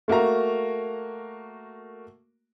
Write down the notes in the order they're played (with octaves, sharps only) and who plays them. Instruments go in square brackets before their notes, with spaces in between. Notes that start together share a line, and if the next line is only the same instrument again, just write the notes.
[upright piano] A3 A#3 F#4 A#5